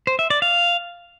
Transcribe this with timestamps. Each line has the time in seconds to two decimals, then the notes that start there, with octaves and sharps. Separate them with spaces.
0.07 C5
0.19 E5
0.30 D5
0.42 F5